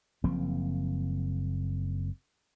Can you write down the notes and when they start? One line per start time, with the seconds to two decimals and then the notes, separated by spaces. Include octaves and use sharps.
0.24 F#1 F3 A#3 C4